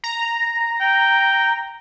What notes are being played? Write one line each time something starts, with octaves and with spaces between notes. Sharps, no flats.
A#5
G5